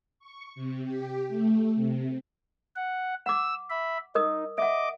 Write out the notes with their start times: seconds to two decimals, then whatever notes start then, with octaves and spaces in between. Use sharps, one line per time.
0.19 C#6
0.55 C3
0.84 G4
1.28 A3
1.75 C3
2.76 F#5
3.26 F#5 D6 E6
3.70 E5 B5
4.15 D#4 A#4 D#5 D#6
4.58 D#5 E5 F#5 D6